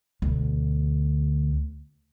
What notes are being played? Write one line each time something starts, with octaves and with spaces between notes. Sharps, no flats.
D2 B2